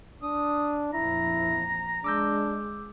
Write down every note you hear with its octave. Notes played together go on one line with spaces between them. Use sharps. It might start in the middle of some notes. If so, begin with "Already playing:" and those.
D4 D#6
A#1 F2 E4 A#5
G#3 D4 D6 E6 G6